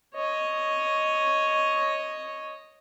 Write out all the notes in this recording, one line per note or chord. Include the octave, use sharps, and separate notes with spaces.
C#5 D#5